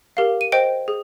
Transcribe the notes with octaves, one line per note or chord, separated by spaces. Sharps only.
G4 A#4 F5
D#7
C5 D#5 G5 D7
G#4